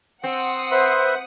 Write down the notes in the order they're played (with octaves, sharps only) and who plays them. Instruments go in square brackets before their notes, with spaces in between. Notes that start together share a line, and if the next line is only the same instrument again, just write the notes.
[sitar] C4 [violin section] F#5 D#6
[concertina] B4 E5 C6 [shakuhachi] C5